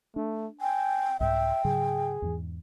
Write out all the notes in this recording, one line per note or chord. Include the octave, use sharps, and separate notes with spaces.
A3 D4
G5 G#5
C2 G#2 E5 G5
G#2 C#3 F#3 G#4
E2 G#2 E3